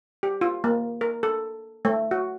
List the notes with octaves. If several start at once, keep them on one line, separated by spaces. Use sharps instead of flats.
G4
F4
A#3
A#4
A4
A3
F#4